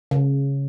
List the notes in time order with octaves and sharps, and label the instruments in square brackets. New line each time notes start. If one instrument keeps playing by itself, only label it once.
[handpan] C#3